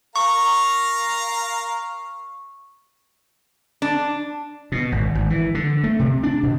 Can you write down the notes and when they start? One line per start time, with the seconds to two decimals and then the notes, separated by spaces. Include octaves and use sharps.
0.16 A#4 F5 A#5 C#6
3.82 D4
4.72 B2
4.92 G#1
5.15 G#1
5.30 E3
5.55 D3
5.83 A3
5.99 C3
6.23 D4
6.43 B2